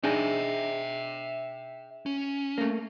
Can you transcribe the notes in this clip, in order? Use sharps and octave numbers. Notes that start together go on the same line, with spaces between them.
D4 D#4 G#4 E5 G5
C#4
A3 A#3